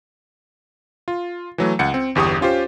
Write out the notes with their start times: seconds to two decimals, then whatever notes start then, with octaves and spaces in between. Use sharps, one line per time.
1.08 F4
1.58 E3 F#3 A3
1.79 C#2 F#5 C#7
1.94 C4
2.15 G1 E2 G4 C#6 D#6
2.41 C#4 F4 G4 C5